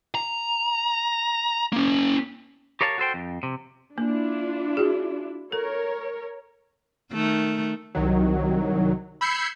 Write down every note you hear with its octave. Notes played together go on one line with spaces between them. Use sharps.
A#5
A#3 C#4
G4 A#4 C#5 F5 F#5 A5
F#4 A4 C5 G5
F2
C3
A#3 D4 E4 F4
F#4 G#4
A4 A#4 C#5
D#3 A3
C2 D#3 F#3
B5 E6 G6 G#6 C7 C#7